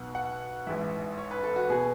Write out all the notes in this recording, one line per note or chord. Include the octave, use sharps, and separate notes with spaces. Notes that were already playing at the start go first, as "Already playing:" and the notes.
Already playing: B1 B2 F#5
F#5
A1 G#2 E3 E5
C#5
B4
A4
F#4
B2 G#4